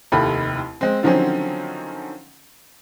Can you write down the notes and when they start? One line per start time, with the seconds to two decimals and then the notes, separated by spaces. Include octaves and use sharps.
0.12 F1 D#2 E4 G4 A4 B5
0.81 G#3 C4
1.03 D3 D#3 F3 F#3 C4 C#4